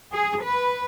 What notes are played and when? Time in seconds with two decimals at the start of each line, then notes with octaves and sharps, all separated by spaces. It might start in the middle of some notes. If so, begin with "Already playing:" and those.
0.12 G#4
0.43 B4